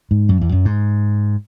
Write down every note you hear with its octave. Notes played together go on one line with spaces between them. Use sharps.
G#2
F#2
E2
F#2
G#2